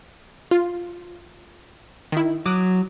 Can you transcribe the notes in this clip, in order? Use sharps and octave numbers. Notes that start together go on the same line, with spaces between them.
F4
D#3 E4
F#3 D6 D#6 F#6